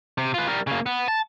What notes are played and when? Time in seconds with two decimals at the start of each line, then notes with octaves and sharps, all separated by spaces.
0.18 C3
0.34 F4 B4
0.47 G3 A#4
0.67 C#3 A#3
0.86 B3
1.08 A5